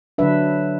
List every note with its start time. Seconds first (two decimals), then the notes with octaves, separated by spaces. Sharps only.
0.18 D3 F#3 D4 B4 E5